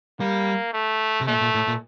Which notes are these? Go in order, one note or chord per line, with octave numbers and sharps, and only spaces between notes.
G3 A#3
A3
C3
A#2 A3
A#2
A2
A#2